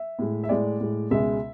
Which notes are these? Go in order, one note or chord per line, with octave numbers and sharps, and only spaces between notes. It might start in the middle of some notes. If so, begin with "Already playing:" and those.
Already playing: E5
A2 G#3
E5
A2 G#3 D5
A2 G#3
C#2 B2 G#3 E5